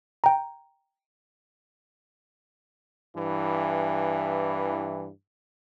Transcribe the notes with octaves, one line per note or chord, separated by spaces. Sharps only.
G5 A#5
G2 E3